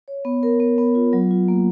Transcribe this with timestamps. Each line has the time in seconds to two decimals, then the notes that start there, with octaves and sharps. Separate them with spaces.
0.08 C#5
0.25 B3
0.43 A#4
0.60 B3
0.78 B3
0.95 F4
1.13 F#3
1.31 F4
1.48 A#3